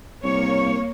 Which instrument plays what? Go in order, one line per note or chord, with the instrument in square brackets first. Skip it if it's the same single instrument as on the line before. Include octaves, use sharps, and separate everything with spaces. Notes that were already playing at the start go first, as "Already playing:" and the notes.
[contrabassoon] C2 [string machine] A#3 [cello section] C#5